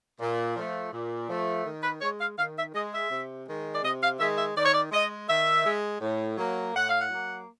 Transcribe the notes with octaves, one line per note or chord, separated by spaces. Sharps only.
A#2
F3 A3
A#2
F3 A3
D#3
B4
G#3 C#5
F5
D#3 F5
E5
G#3 D#5
E5
C3
D#3 G#3
D5
C3 D#5
F5
D#3 G#3 E5
E5
D#3 D5
C#5
D5
G#3 D#5
D#3 E5
G#3
A2
F#3 A#3
A2 F#5
F5
F#5
F#3 A#3